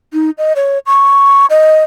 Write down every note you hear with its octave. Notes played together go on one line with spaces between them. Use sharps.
D#4
D#5
C#5
C#6
D#5